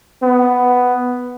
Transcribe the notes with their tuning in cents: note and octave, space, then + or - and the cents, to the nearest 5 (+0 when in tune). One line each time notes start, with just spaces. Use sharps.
B3 +5